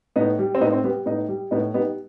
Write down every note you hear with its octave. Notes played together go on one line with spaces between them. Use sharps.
A2 B3 D#4
G3
C4
A2 B3 D#4
C4
G3 B3
A2 B3 D#4
G3
A2 B3 D#4
G3 B3 D#4